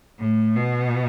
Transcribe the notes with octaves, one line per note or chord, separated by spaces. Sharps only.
A2
B2